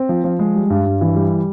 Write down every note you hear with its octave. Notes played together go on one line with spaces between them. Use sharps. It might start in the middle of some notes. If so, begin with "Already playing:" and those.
Already playing: C4
F3
F3
G#3
G3
G2
G2
E3
G3